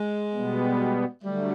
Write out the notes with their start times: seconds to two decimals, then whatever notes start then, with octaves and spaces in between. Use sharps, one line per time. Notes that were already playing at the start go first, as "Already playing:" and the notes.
Already playing: G#3
0.33 B2 G3 B3
1.23 D3 F#3 G3 A3